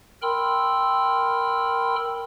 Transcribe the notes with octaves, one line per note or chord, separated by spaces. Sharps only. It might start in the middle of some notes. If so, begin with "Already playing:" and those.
A#4 G5 B5 C6 E6 F6